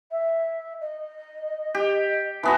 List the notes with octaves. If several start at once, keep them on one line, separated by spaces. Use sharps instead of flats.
E5
D#5
G4
E3 B3 F#4 A5